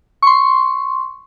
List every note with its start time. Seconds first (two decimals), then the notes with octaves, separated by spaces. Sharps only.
0.22 C6 C#6